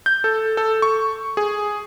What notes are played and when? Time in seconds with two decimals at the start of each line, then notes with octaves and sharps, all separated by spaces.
0.06 G6
0.24 A4
0.57 A4
0.82 C#6
1.37 G#4